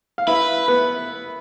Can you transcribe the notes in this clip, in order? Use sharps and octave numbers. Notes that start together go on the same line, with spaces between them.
F5
E4 B4 E5
B3 B4